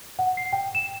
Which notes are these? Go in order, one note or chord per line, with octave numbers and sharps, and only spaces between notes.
F#5
C7
G5
E7